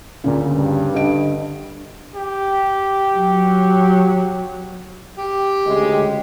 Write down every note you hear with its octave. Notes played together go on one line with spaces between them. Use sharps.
D2 A#2 C#3
G2
D3 D#5 D7
G4
F#3
G4
D2 C#3 G#3